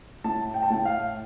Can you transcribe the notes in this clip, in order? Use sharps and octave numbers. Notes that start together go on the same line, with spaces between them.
A2 A5
G5
A5
A2 G5
F5